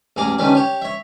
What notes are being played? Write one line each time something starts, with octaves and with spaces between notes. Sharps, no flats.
A1 E2 G#4 A#4 D6
D3 D#3 G3 C#4 B4
G4 C#5
C#5 E5